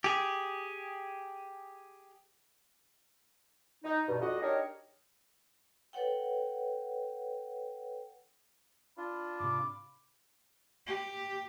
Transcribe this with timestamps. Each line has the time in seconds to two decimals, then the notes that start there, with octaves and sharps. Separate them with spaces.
0.04 G4 G#4
3.84 D#4
4.08 G2 B2
4.21 F2 G3 F#4 D#5
4.41 D4 D#4 G4 G#4 A#4 C#5
5.93 A4 B4 C#5 F#5 G5
8.97 D4 F4 B5
9.40 G#2 C3 D6
10.87 G4